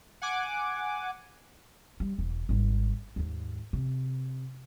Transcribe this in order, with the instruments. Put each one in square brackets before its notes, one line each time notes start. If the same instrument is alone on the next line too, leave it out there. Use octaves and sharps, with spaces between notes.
[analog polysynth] F#5 G#5 D6
[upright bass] G3
E1
G#1 G3
D#2 G#2
C3